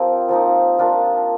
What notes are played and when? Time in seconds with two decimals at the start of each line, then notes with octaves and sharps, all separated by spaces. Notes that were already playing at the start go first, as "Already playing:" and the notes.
Already playing: F3 C4 G4 A#4
0.29 F3 A#3 D#4
0.79 D4 F4 A#4